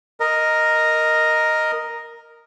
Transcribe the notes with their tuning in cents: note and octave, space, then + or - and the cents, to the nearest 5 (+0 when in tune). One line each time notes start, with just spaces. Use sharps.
A#4 +0 D#5 +0